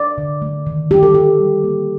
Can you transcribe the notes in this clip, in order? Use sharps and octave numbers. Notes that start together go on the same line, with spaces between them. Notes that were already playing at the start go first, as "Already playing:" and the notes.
Already playing: D5
D3
A3
D#3
A3 G4
A4
D#3 G4
G3
A#3